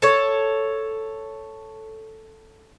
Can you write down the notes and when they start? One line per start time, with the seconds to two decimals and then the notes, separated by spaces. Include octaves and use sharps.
0.02 A4 C#5